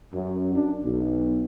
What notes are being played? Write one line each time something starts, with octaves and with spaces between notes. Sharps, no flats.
F#2
D4
B1